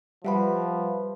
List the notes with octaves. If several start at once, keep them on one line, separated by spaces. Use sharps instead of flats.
F3 G3 B4 E5 F#5 B5